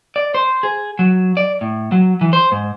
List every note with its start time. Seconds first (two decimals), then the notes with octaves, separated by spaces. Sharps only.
0.16 D5
0.35 C5
0.63 G#4
0.99 F#3
1.37 D5
1.61 A2
1.92 F#3
2.21 E3
2.33 C5
2.52 G#2